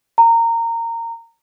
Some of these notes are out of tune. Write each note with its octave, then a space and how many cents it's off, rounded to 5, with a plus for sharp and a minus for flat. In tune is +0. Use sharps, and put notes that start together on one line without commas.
A#5 -20